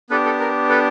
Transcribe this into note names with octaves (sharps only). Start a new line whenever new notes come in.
B3 D4 G4 A4 B4
A4
A#4
A4 B4